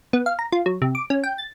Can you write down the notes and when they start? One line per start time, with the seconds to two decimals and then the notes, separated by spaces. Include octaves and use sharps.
0.13 B3
0.26 F5
0.39 A#5
0.52 F4
0.66 F#3
0.82 C3
0.95 D6
1.10 C#4
1.24 G5
1.38 A6